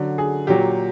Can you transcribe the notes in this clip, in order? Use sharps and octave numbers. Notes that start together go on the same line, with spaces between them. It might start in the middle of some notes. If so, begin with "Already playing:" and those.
Already playing: D3 F#3
G#4
A#2 F#3 G4